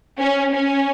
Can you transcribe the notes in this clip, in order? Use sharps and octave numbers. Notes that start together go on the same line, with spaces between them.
C#4
C#4